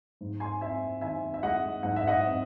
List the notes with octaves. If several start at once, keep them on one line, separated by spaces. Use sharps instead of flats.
G#2
G#5 C6
C4 E5 G#5
D#3 E5 G#5
E5
G#3 D#5 F#5
G#2 F#5
E5
D#5 F#5
C4